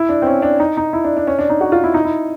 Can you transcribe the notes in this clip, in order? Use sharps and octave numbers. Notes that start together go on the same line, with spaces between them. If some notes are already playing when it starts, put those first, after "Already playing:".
Already playing: E4
D4
C4
C#4
D4
D#4
D#4
E4
D4
D4
C#4
D4
D#4
F#4
F4
E4
D#4
E4